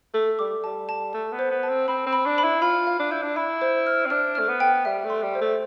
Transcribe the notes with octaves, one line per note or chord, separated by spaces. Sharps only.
A3 A4
G3 D6
G3 A5
A5
A3 A5
B3
C5
B3
A5
C4
C4 B5
C4
B5
D4
B5
E4
F4 B5
F5
D4
E4 G6
D4
E4 B5
C5
F6
C4
D4 F6
A3 F6
B3
G5
G3 E5
A3
C6
G3
C5
A3